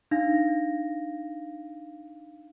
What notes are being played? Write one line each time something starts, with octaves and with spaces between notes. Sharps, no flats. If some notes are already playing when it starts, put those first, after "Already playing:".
D4 D#4 F5 A#6